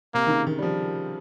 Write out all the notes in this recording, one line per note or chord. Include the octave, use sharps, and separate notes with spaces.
C3 A#3
D#3
C#3
D#3
G3
F3